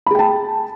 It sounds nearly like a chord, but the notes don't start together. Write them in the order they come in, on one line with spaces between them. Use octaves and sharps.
B5 G#4 G5 A5